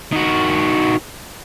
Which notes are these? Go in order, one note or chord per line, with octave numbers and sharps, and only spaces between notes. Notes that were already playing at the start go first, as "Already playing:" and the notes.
D#3 F#4